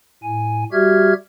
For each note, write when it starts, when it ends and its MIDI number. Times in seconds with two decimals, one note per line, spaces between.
0.23 0.64 45
0.23 0.64 80
0.72 1.13 55
0.72 1.13 66
0.72 1.13 67
0.72 1.13 76
0.72 1.13 89
0.72 1.13 92